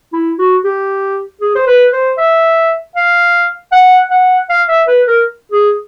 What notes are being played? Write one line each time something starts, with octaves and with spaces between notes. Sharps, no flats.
E4
F#4
G4
G#4
C5
B4
C5
E5
F5
F#5
F#5
F5
E5
B4
A#4
G#4